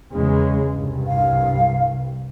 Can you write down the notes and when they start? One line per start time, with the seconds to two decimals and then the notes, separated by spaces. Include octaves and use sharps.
0.13 E2 C#3 G#3
0.74 C2 G2
1.07 F5